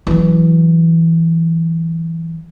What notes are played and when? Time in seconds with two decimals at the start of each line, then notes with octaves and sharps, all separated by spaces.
0.07 E3 F#3